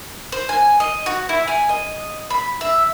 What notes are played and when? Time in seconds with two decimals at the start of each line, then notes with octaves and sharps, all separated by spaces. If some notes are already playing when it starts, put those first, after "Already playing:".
0.32 C5
0.49 G#5
0.80 D#5
1.06 F#4
1.29 E4
1.48 G#5
1.69 D#5
2.30 B5
2.61 E5